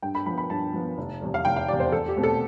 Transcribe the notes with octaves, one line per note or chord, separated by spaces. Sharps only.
G2 G5
B5
F3 B3 B5
B5
G2 A5
F3 B3
F1
E2 C3 G3
F5
F1 G5
F5
E2 C3 G3 D5
C5
E2 A4
G4
B2 A3 C4
A4